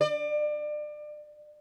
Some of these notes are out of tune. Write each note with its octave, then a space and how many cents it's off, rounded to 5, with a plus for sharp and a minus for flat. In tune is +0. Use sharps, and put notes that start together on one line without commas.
D5 +30